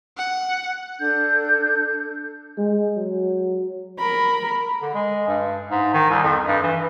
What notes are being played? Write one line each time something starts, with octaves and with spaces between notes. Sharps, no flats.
F#5
D4 A4 G6
G#3
F#3
A#4 B5
D3
G#3
G2
G#2
D#3
C2
F2
G2
E3